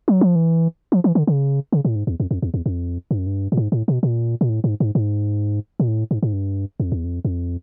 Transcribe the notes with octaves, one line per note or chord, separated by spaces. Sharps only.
F#3
F3
E3
F3
E3
D3
C#3
C#3
A2
G#2
E2
F2
F2
E2
E2
F2
G2
F#2
G2
A2
G#2
A2
B2
A#2
A#2
A2
G#2
G#2
G#2
A#2
A2
G#2
G#2
G2
F2
E2
F2
F2